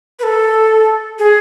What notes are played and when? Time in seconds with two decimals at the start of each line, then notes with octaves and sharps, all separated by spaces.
0.19 B4
0.23 A4
1.19 G#4